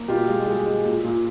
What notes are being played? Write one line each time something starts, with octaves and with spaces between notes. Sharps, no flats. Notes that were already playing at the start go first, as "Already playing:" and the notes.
Already playing: A#3
B2 F4 G4
G#3
G#3
G#3
A#2
A#2